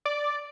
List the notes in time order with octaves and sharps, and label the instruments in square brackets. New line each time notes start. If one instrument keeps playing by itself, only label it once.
[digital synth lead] D5